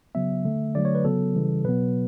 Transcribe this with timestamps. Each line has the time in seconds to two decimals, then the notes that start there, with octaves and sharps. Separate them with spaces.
0.15 C#3 F#3 B3 E5
0.45 D3 A3
0.75 D3 F#3 A3 D5
0.85 C#5
0.95 B4
1.05 C#3 F#3 B3 A4
1.35 C#3 E3 G3
1.65 B2 F#3 B3 B4